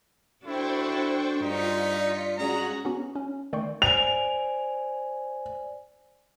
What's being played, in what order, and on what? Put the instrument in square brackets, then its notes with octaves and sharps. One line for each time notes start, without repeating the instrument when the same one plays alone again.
[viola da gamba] D4 F#4 A4 [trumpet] E4 [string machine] C5 G5 C#6
[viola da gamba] G2 [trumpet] D#4 [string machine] F4 B6 C#7 [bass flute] D5
[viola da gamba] G#3 C#4 G#4 [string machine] F#4 F#6 [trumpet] A#5
[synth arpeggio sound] B3 C#4 F#4
C#4
D#3 A3 D5 G5 C6 C#6
[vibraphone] C5 D5 G#5 [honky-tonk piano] F7